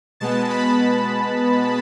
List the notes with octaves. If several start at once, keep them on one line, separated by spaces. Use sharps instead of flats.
B2 G#3 B3 A5
B5